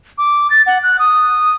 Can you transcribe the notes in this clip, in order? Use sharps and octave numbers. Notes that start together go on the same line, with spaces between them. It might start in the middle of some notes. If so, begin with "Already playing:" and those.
D6
A6
F#5
F#6
D#6